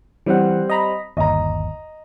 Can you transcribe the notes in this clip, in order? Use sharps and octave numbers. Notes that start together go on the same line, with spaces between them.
E3 G3 C4 F#5
D#5 A#5 B5
G1 D#2 D#5 A#5